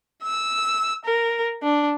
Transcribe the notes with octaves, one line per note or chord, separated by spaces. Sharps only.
E6
A#4
D4